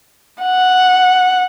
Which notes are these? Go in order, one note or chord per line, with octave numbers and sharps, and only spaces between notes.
F#5